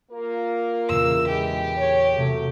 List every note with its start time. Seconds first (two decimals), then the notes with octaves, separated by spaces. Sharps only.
0.12 A#3 F4 A#4
0.89 E2 A#2 C#3 E6
1.28 E3 G#3 G4
1.77 C#5
2.16 C3 F#3 A3